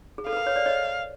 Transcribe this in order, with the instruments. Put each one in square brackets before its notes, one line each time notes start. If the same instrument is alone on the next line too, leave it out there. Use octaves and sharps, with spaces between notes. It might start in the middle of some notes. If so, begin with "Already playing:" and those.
[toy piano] G#4
[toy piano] A4 [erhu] F5
[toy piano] B4
A#4
B4 C#5
C5 D5
C#5 D#5